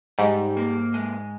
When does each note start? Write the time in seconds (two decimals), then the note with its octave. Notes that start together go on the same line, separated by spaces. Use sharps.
0.19 G#2 G3
0.57 A#3
0.94 G#3